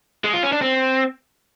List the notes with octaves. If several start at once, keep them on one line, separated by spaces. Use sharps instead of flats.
G#3
F4
C#4
D4
C4